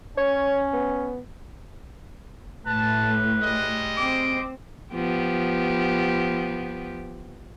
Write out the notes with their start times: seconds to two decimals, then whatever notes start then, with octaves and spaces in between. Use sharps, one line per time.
0.18 C#4 C#5
0.73 B3
2.66 A2 B4 A5
3.42 G3 G#3 D#5
3.97 C4 D6
4.94 F3 B3 G4